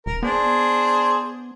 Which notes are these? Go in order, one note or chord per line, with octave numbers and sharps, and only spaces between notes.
D#1 A#4
B3 D4 G#4 C5